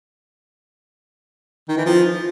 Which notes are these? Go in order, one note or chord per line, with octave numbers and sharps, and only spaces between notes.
D#3
E3
F3